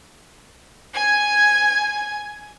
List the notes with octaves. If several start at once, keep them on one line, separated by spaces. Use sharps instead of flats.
G#5 G#6